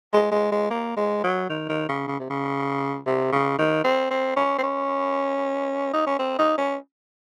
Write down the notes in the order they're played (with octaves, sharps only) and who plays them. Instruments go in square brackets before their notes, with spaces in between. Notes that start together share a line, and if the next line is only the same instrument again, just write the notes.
[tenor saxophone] G#3
G#3
G#3
A#3
G#3
F#3
D#3
D#3
C#3
C#3
C3
C#3
C3
C#3
D#3
C4
C4
C#4
C4
C#4
D#4
C#4
C4
D#4
C#4